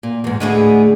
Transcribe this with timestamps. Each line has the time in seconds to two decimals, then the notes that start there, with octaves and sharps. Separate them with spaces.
0.03 A#2
0.24 E2 G#2
0.40 D2 A2 D3 G#3 B3 G#4